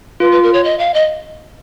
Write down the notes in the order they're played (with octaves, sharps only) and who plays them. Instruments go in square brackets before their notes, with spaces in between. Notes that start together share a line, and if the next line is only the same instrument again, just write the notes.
[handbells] F4 [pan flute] B4
[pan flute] B4
A#4
C#5
D#5
F5
D#5